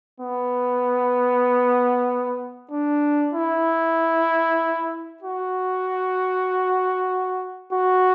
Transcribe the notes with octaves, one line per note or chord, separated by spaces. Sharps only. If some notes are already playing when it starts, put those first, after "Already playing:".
B3
D4
E4
F#4
F#4